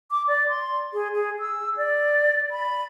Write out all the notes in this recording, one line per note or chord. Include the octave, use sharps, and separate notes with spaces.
D6
D5
C6
G#4
G#4
E6
D5
B5